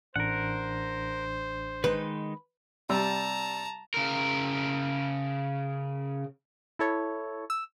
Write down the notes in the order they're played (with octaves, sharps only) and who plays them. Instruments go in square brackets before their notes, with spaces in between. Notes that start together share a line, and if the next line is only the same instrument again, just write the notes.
[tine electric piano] A1 D4 [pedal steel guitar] A#4 F#5 [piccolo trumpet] C5
[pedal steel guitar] D#3 G#3 D#4 [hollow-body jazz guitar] B4
[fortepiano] C3 G3 E6 [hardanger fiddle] A5 A#5
[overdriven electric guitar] C#3 A#4
[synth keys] E4 A4 C#5
E6